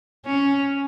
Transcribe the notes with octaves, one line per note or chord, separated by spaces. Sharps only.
C#4